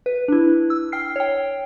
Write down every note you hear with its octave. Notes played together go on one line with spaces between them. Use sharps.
B4
D4 E4
E6
G5 F6 C7
C#5 G5